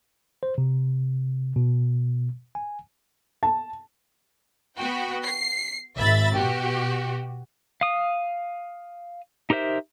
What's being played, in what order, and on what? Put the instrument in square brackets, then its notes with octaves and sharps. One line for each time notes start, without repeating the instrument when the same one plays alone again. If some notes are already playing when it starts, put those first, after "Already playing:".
[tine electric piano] C5
C3
B2
G#5
[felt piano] A5
[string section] B3 F#4 G5
C7
G#1 E5 B5 A6
B2 F#4 G4
[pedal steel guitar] F5 D#6
D#4 G4 A#4 C5 E5